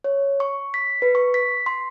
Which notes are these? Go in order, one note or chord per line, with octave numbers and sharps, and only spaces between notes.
C#5
C#6
B6
B4
C#6
B6
C6